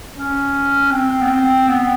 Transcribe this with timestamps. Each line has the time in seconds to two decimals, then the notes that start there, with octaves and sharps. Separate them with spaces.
0.15 C#4
0.91 C4
1.22 B3
1.29 C4
1.69 B3